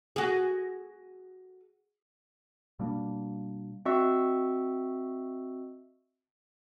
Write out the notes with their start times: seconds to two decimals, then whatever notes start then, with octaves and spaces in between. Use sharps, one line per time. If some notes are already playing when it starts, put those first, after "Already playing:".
0.16 F#4 G#4
2.79 B2 G3 A#3 D4
3.85 C4 F#4 D#5 E5 C#6 E6